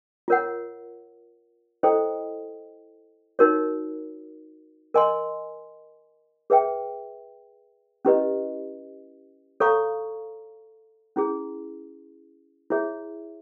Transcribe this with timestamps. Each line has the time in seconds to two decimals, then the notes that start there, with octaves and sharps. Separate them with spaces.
0.28 F4 A#4 C#5 F#5
1.83 E4 A4 C5 D#5 G5
3.39 D#4 F#4 A#4 C#5
4.94 A#4 D#5 G#5 C6
6.50 G#4 B4 E5 G5
8.05 C#4 E4 G4 B4 D#5
9.60 A4 C#5 F5 A#5 C#6
11.16 C#4 E4 G#4
12.70 E4 G#4 C#5 E5